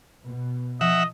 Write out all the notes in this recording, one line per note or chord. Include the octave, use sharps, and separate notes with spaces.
B2
F3 D#5 E5 F#5